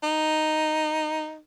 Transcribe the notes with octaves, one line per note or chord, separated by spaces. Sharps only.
D#4